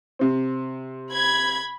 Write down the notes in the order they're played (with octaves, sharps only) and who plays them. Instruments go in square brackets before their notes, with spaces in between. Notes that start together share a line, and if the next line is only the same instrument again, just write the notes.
[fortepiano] C3 C4
[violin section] B5 G#6